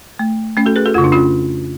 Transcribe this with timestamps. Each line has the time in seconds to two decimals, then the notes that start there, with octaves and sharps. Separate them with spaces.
0.19 A3
0.57 A3 C#4
0.66 F#4 A4
0.76 G#4 B4
0.86 F#4 A4
0.94 F2 C#3 F4
1.04 D4
1.12 C#4 F4